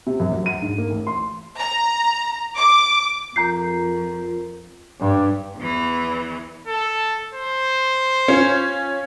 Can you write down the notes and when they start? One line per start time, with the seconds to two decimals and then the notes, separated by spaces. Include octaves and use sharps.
0.07 C3
0.20 F#2
0.32 F#3
0.46 D#7
0.62 G#2
0.78 A#3
0.90 A1
1.07 C6
1.58 A#5
2.57 D6
3.36 F2 F4 A#4 A#5 G6 C7
4.99 G2
5.57 E2 E3
6.67 A4
7.34 C5
8.28 C#4 F4